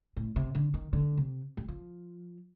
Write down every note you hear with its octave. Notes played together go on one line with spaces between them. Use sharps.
A2
C3
D3
D#3
D3
C3
G3
F3